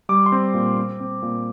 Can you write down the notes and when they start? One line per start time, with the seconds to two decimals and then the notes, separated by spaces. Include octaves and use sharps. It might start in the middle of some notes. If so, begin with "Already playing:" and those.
0.09 G3 D6
0.26 C6
0.32 C4
0.54 A#2
0.78 C4
1.00 C4
1.22 A#2